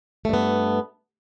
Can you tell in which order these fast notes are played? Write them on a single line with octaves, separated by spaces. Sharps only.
A3 G2 B3